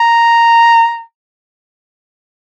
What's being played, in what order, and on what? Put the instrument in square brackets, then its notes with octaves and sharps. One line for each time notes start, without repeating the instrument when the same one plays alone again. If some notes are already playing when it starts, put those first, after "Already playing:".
Already playing: [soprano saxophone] A#5